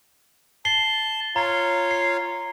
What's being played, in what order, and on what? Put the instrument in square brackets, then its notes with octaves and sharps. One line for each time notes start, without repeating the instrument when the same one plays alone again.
[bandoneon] A5 [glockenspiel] C7 G7
[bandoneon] F4 C#5 F5 [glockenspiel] A#5
[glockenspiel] C7